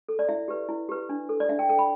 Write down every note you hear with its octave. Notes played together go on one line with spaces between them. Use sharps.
A4
D5
E4 E5
G4 B4
E4
G4 B4
D4
A4
D5
D4 E5
G5
A4 G5
B5